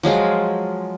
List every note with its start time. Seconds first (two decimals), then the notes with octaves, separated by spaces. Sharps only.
0.03 F3 F#3 G#3 F4